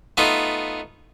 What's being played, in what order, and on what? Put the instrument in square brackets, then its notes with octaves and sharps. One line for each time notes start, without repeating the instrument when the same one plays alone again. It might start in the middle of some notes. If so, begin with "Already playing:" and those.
[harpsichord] A3 B3 D#4 F4